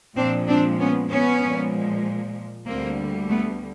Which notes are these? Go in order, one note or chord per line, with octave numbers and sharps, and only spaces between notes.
A#2 F3 G#3 C4 D4
C4 D4
B3 C#4
B3 C#4
A#2 F3 G#3
D2 D3 G3 A#3 C4
A3 B3